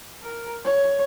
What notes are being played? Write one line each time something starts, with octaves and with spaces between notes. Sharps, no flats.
A#4
C#5